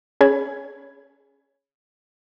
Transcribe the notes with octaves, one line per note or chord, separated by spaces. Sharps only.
C#4 G#4 B5 G#6